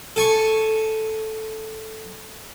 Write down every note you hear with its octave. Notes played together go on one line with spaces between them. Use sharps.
A4 G#5 C#6